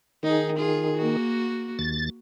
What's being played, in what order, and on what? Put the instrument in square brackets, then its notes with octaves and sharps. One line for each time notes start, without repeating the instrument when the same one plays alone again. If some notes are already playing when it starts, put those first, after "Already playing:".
[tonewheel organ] D#3 [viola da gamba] D#4 G#4
[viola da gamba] F4 G#4
A#3 F#4
[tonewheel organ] D#2 A6